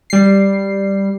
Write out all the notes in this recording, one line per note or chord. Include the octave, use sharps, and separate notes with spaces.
G3 C7